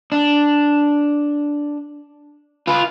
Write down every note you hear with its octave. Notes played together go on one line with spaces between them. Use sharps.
D4
F4 B4